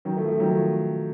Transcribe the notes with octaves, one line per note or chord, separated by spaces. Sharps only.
D#3 F#3
F3 A3
F3 A3
D#3 F#3
F3 A3